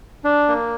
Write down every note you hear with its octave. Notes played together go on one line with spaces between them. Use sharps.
D4
A#3